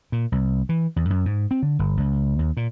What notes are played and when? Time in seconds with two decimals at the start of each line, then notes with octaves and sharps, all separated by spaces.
0.12 A#2
0.32 C2
0.69 E3
0.96 E2
1.10 F#2
1.26 G#2
1.51 C4
1.63 D3
1.79 G1
1.97 C#2
2.39 D#2
2.57 A#2